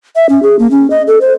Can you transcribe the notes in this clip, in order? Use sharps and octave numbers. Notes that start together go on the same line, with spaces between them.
E5
C#4
G#4
A#3
C#4
D#5
A4
C5